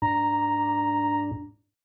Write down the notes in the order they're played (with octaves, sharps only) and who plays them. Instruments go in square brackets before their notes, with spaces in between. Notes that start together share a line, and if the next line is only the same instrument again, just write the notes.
[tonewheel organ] G#2 D4 [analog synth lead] A#5